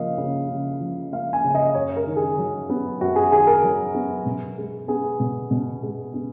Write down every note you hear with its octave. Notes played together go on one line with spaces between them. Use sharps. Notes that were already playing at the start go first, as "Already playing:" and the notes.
Already playing: C#3 F3 A#3 D#5 F5
C#3
C#3
F3
A#3 F5
G#5
C#3
D#5
F#2 C#5
A#4
D#3
G#4
F#3
B3
F#2 F#4
G#4
D#3 G#4
A#4
F#3
B3
B2
G#3
B3 G#4
B2
B2
G#3
B3